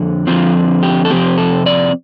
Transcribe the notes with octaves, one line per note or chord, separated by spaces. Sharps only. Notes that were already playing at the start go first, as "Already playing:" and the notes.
Already playing: F2 D3
F2 D3 F3 C4 F4
G4
A4
F2 C3 F3 C4 G4
A4
D5